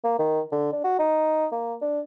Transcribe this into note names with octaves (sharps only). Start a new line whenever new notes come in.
A#3
D#3
D3
D4
F#4
D#4
A#3
D4